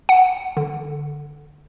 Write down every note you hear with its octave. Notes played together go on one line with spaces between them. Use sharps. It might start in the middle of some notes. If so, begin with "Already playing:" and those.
F#5
D3